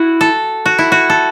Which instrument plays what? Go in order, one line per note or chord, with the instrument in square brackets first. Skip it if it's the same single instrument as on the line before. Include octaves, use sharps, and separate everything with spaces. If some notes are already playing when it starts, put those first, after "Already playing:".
Already playing: [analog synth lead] E4 [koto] F#4
[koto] A4
F#4
E4
F#4
A4